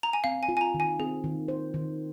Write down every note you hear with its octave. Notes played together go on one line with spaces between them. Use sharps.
A#5
G#5
C4 F5
G#5
F4
G#5
A#5
D#3
G#5
C4 G#4
D#3
C5
D#3